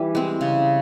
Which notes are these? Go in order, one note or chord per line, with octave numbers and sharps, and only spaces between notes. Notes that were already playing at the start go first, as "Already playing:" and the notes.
Already playing: E3 G3 G4
G#3 C4
C#3